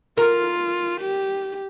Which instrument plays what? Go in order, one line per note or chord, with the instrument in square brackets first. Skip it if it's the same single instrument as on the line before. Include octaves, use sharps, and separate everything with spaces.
[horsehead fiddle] F4 [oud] A#4
[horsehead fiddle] G4